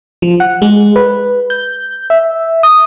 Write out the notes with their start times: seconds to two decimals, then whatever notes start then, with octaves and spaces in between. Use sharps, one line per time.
0.22 F3
0.40 F#5
0.62 G#3
0.96 B4
1.50 G6
2.10 E5
2.63 D#6